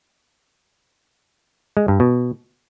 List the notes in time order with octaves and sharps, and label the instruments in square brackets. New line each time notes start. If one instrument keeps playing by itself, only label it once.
[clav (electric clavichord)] G#3
G2
B2